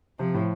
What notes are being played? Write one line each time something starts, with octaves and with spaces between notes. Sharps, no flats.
C3 F3
A2